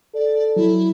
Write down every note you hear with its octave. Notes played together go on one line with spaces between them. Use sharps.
A4 D5
F#3 E4